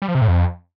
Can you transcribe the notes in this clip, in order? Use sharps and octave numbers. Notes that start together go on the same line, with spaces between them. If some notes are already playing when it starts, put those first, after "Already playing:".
G3
F3
C3
A2
F2